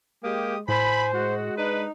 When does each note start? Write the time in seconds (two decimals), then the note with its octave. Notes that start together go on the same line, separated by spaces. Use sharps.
0.24 G#3 A#3 G4 D#6
0.68 A2 C5 G#5 B5
1.14 G#3 F#4
1.58 D4 D#4 B4